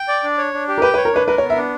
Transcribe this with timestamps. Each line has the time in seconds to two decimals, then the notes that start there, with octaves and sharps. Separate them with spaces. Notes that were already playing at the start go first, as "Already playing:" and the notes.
Already playing: G5
0.08 D5
0.24 D4
0.38 C#5
0.53 D4
0.68 G4
0.78 A#4
0.82 B4 G5
0.94 B4
0.97 C#5
1.05 A#4
1.13 D4 B4
1.27 A#4 B4
1.38 C#5
1.42 B3
1.50 E5
1.56 D4